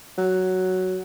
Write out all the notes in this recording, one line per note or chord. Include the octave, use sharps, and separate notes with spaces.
F#3